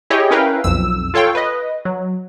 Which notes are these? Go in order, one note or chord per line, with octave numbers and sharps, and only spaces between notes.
E4 G4 G#4 C#5 D#5 G5
C#4 E4 A#4 B4 F5 G5
B1 F2 E6
F4 A4 C#5 F5 G5
B4 D#5
F#3